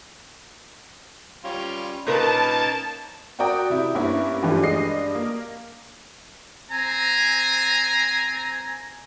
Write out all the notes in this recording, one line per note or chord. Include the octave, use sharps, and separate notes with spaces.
G3 C#4 F4
A#2 A#3 C#4 D#4 A#4 B4 A5
F#4 A#4 D5 G5 D#6
C3 E4
G2 A#3 B3 C#4 E4
G2 E3 F3 G3 A3
G2 G#3 D4 D#5 C7
A#3
C4 G#5 A#5